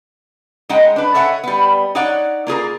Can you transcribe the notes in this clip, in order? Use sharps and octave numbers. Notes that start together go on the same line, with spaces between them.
G#3 D#4 D#5 F#5 G5
D4 B4
A4 C#5 E5 F#5 G#5
G3 B3
D#4 C#5 D5 F#5
A#3 F4 G#4 A#4